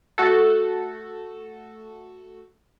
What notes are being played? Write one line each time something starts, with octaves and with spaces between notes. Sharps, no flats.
A3 F#4 A4